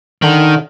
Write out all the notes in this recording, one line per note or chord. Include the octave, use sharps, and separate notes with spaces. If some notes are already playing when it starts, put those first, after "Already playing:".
D3 D#3